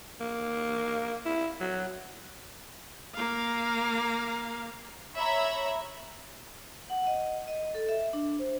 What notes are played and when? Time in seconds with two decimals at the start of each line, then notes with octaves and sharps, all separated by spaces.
0.20 A#3
1.26 E4
1.60 F#3
3.14 A#3 F5
5.15 C#5 E5 A#5 B5
6.90 F#5
7.07 D#5
7.48 D#5
7.75 A4
7.89 E5
8.13 D4
8.39 C5